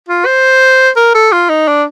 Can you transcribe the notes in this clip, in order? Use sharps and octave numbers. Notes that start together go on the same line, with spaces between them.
F4
C5
A#4
A4
F4
D#4
D4